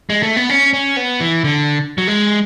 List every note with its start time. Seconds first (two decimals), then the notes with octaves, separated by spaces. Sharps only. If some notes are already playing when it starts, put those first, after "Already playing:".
0.10 G#3
0.23 A3
0.36 B3
0.50 C#4
0.73 C#4
0.97 B3
1.20 E3
1.44 D3
1.98 F#3
2.08 G#3